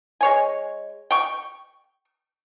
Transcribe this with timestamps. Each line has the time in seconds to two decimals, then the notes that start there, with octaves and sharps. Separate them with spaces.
0.21 G#3 C#5 G#5
1.11 G5 C#6